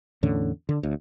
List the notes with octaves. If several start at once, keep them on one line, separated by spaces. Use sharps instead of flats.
E2 A2 D3 C#4
D3
D2